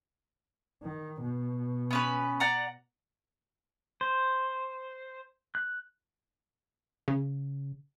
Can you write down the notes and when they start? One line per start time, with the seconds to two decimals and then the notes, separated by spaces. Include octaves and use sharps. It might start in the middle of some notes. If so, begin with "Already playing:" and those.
0.83 D#3
1.22 B2
1.91 B3 C#4 B4
2.40 D5 F#5 A#5
4.01 C5
5.55 F#6
7.08 C#3